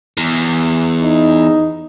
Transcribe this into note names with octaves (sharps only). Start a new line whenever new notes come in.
E2
D#4